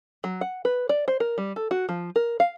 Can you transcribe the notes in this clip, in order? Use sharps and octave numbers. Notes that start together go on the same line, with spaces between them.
F#3
F#5
B4
D5
C5
A#4
G3
A4
F#4
F3
A#4
F5